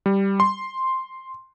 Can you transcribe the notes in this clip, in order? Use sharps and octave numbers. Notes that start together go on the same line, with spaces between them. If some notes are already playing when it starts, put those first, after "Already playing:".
G3
C6